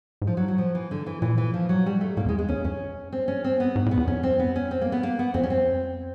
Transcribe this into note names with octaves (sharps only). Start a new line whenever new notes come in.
G#2
A2 F3
F#3
F#3
F3
E3
D3
E3
A#2 E3
E3
F3
F#3
G3
A3
A2 A#3
E2
G#3
F2
G#3
E2 C#4
F2 C#4
C4
C#4
C4
B3
G#2
A2
B3
E2
F2 C#4
C4
B3
C#4
C4
A#3
B3
A#3
B3
F2 C4
C#4
C4